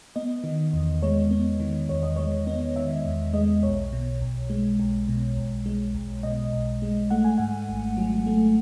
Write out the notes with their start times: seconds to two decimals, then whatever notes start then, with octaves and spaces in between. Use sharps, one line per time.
0.16 B3 D#5
0.44 D#3
0.73 E2
1.02 G#3 C#5
1.31 B3
1.60 D#3
1.89 E2 C#5
2.03 D#5
2.16 G#3 C#5
2.47 B3
2.76 D#3 E5
3.05 E2
3.33 G#3 D#5
3.63 B1 C#5
3.92 B2
4.21 B1
4.50 G#3
4.80 B1
5.08 B2
5.37 B1
5.66 G#3
5.94 B1
6.23 B2 D#5
6.53 B1
6.82 G#3
7.10 A3 F#5
7.24 G#5
7.38 G#2 F#5
7.69 G#1
7.97 F#3
8.26 A3